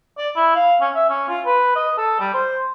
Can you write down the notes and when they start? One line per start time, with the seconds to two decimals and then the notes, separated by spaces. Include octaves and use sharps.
0.18 D5
0.36 E4
0.55 F5
0.81 C#4
0.95 E5
1.09 C#4
1.29 F4
1.45 B4
1.76 D#5
1.98 A4
2.20 G3
2.34 C5